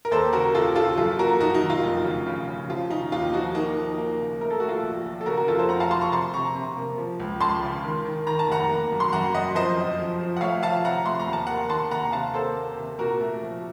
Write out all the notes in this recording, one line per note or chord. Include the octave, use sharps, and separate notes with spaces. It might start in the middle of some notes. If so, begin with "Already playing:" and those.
A#4
D#2 A4 C5
C#3 F#4 A#4
D#2 F4 A4
C#3 F4 A4
F#2 F4 A4
A#3 F#4 A#4
F#2 D#4 F#4
D#4
D#3
F4
F1
C#3
C#3
C#3
F3 F4
C#3 D#4
D#2 F4
F3 D#4 F#4
A#3 D#4 F#4
F3
A#3
C#3
A3 A#4
A4
A3 F#4
F4 A4
A#1
A#1
A4
C#3 F#4 A#4
F#4 A#4
F2 F4 A4
A4 C5
F1 F#5 A#5
F5 A5
F1 A5 C6
A#5 C#6
C3 A5 C6
C3 A#5 C#6
C3
A#3
F3
C#2
C#2 A5 C6
C#3
D#3
D#3
D#3 A#5
A5
F1 F#5 A#5
A#3
F#2
C6
F#2 F#5 A#5
F#2 D#5 F#5
F2 C5 D#5
F2
F3
F3
F#5
A3 C#5 F5
F3 F5 A5
C3 F#5 A#5
A3 C6
A#5
D#2
A5
A#3 F#5 A#5
D#3 A5 C6
D#2 F#5 A#5
C3 F5 A5
A#3 A4 C5
A#3
C3
A#2 F#4 A#4
A3
F3